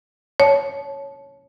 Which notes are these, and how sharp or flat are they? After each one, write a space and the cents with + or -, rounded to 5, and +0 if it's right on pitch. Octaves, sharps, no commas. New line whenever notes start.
C#5 +0 A5 -20